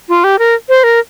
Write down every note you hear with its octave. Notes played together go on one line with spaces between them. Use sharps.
F4
G4
A#4
C5
A#4